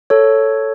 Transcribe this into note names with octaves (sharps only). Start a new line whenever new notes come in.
A4 C#5